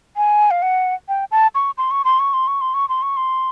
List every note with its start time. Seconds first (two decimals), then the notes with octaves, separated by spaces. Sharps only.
0.16 G#5
0.51 F5
0.62 F#5
1.09 G5
1.31 A5
1.55 C#6
1.78 C6
1.91 C#6
2.05 C6
2.19 C#6
2.34 C6
2.48 C#6
2.61 C6
2.74 C#6
2.89 C6
3.02 C#6
3.17 C6